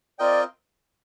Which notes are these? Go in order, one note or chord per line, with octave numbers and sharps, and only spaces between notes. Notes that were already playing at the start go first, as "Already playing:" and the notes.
C4 F4 A#4 D5 D#5 G5